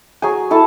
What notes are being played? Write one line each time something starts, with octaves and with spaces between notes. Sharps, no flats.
F#3 G#4 G#5
E4 A4 A5